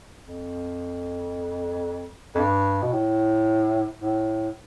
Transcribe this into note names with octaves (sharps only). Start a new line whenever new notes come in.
F2
F2
G2
B2
A2
A2